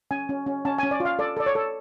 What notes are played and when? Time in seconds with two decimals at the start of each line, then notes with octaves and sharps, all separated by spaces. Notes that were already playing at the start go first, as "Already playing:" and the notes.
0.11 C#4 G#5
0.29 C#4
0.46 C#4
0.65 C#4 A5
0.78 C#4 G#5
0.91 D5
1.00 F4
1.05 F5
1.19 A4 D5
1.37 A4 D5
1.46 C#5
1.55 A4